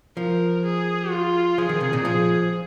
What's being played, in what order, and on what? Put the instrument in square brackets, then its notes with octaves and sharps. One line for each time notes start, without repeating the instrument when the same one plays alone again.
[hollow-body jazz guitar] F3 [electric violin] A#4
[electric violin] G#4
F4
[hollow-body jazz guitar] F3 [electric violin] G#4
[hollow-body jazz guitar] D#3
C3
A#2
[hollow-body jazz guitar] F3 [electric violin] G#4